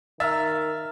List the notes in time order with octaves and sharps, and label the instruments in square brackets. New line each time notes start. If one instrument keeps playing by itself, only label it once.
[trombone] D#3 [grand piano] E5 [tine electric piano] A#5 F6 A6